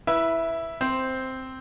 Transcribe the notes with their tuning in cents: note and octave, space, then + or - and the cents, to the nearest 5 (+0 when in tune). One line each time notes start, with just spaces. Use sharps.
E4 +0 B4 -20 E5 +0
C4 -5 C5 +0